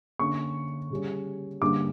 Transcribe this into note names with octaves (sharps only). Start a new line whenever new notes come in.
D3 A#3 C#4 C#6
C#3 G3 C#4
G2 D3 A#3 C#4 D6